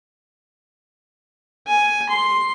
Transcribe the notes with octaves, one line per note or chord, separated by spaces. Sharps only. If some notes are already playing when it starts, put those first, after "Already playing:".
G#5
C6